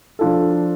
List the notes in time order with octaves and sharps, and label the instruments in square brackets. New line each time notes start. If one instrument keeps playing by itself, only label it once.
[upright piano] F3 D4 F4 A4